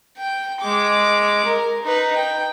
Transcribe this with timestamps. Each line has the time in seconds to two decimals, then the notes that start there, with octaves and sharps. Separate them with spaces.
0.17 G5
0.60 G#3 D6
1.46 A#4
1.83 D#4 B4
2.16 G5